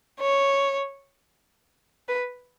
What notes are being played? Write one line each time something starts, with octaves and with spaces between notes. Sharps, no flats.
C#5
B4